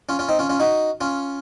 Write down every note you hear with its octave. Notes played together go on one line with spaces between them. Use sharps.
C#4 F4
C#4 F4
C4 D#4
C#4 F4
C#4 F4
D#4 F#4
C#4 F4